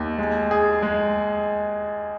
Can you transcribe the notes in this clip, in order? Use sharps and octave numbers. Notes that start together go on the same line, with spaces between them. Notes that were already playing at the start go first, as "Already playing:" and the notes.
Already playing: D#2
G#3
G#4
G#3